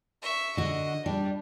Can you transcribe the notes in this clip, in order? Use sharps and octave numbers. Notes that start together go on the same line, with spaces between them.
E5 C#6
D3 F#4 D#5
G3 D4